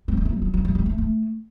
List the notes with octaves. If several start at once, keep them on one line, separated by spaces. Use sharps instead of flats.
G3
G#3
A3
G3
F#3
F#3
G3
G3
A3
A3